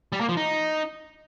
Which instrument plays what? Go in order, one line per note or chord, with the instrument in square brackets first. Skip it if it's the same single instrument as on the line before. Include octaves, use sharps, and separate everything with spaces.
[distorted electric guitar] G3
A#3
F3
D#4